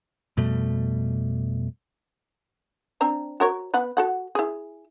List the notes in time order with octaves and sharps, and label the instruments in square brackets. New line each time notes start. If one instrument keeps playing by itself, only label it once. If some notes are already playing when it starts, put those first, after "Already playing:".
[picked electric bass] F2 B2 G3 A3
[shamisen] C4 D4 A#5
F#4 A#4 C#5
B3 B4 F#5
F#4 A4 F#5
E4 G#4